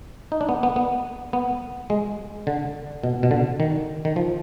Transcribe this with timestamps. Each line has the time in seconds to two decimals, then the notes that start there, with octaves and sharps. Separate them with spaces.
0.32 D#4
0.41 D4
0.49 B3
0.63 B3
0.76 B3
1.33 B3
1.90 G#3
2.47 D3
3.04 B2
3.23 B2
3.31 D3
3.60 D#3
4.05 D#3
4.16 F3